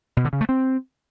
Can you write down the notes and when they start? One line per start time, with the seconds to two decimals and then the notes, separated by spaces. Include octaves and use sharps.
0.17 B2
0.25 D3
0.33 C#3
0.41 A3
0.49 C4